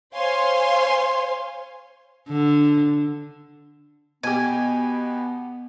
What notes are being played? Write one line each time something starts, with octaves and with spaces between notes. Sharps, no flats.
C5 C#5 F5 G#5 C6
D3
B2 B3 G4 G#5